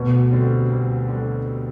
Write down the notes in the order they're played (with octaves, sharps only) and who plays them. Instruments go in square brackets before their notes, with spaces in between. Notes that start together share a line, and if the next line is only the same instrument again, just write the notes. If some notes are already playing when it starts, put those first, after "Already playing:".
Already playing: [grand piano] D2 [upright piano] B2
[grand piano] D3 G3 C4
D2
D3 G3